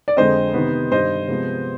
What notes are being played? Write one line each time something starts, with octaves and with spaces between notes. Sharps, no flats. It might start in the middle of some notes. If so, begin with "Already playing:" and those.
D5
F2 D3 G#3 C4 C5 D#5
C3 D#3 B3
G2 D#3 G3 C5 D#5
C3 F3 G#3 B3